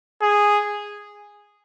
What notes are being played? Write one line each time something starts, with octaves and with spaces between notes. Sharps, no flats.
G#4